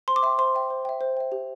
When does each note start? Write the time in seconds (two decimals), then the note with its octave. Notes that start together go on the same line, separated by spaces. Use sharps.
0.08 C5 C6
0.16 D6
0.23 E5 G5 C6
0.38 C5 C6
0.55 E5 G5
0.70 C5
0.85 E5 G5
1.01 C5
1.17 E5 G5
1.32 G4